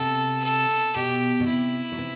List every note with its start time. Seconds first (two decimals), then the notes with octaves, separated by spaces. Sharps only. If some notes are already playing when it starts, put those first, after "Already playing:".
Already playing: C3 A4
0.44 A4
0.96 B2 G4
1.40 B2
1.46 C3 E4
1.92 F#3
1.98 C3 E3